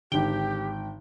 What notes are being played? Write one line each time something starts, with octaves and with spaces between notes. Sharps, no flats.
G#1 D3 D#4 G4 G5 G7